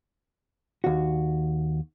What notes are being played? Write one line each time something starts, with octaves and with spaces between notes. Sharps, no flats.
D#2 F#4